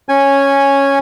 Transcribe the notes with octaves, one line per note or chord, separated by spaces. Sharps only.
C#4 G#5